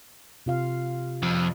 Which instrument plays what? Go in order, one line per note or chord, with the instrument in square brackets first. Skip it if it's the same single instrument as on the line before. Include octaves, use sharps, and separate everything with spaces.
[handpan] C3 F4 F5
[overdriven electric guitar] F2